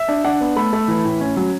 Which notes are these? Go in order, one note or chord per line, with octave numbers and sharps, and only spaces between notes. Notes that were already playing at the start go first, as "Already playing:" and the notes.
Already playing: E5
D4
D4 F#5
B3
A3 B5
A3
E3
A2
C#4
F#3